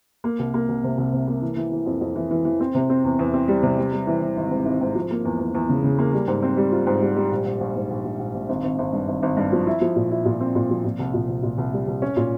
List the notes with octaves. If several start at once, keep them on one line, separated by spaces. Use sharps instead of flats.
A#3
C2
A#3
C2
C3
C2
C3
A#3
E3
E3
E3
F2
F2
E3
E3
E3
C4
C3
C4
E2
E2
C4
G3
C3
G3
G3
E3
E3
G#1
G#2
G#1
G#2
F3
A#3
E2
E2
E2
C#3
C#3
A#3
G3
G#2
C4
G3
F4
G#2
G3
G3
A#1
A#1
A#1
G#2
A#1
A#1
A#1
A#1
G#1
G#1
G#1
G2
G#1
G#1
G2
F3
E4
F3
A#2
E4
A#2
C4
A#2
F3
A#2
C2
A#2
C2
A#2
C2
G3
C2
C#4
A#2